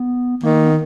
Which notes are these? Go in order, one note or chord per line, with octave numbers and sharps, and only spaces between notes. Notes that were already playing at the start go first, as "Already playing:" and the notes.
Already playing: B3
D#3 A#3
B3